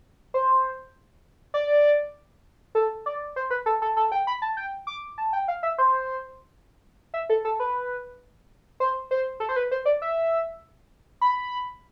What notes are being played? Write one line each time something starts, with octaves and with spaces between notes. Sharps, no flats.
C5
D5
A4
D5
C5
B4
A4
A4
A4
G5
B5
A5
G5
D6
A5
G5
F5
E5
C5
E5
A4
A4
B4
C5
C5
A4
C5
B4
C5
D5
E5
B5